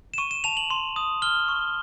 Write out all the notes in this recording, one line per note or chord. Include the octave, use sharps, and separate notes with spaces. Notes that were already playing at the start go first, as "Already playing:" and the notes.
E7
C#6 D#7
E7
A5 F7
F#7
C6
D#6
F6 G7
C#6